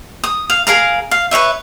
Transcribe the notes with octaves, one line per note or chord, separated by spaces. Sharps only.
D#6
F5
G#4 A#4 F5 A#5
F5
B4 C#5 D#5 E5